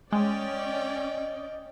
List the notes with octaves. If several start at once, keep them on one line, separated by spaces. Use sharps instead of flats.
G#3 C#4 D5 D#5 G5